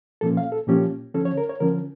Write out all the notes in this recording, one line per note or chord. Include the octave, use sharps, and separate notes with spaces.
A#2 F3 A#3 C#4 A4
F5
A4
A#2 F3 A#3 C#4 G4
D3 F3 C#4 A4
C#5
A#4
C#5
D3 F3 C#4 A#4